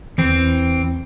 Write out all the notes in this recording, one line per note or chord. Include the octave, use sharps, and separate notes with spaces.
E2 E3 C4